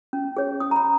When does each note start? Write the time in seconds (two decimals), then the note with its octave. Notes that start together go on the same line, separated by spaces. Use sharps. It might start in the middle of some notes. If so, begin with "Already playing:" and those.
0.13 C#4
0.37 G#4 C#5
0.60 C#4 D#6
0.71 A#5
0.76 B5